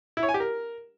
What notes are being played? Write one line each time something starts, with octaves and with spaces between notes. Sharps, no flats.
E4
C#5
G#5
G4
A#4